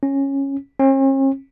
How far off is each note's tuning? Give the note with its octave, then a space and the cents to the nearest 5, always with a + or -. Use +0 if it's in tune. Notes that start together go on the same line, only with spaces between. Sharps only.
C#4 -10
C#4 -45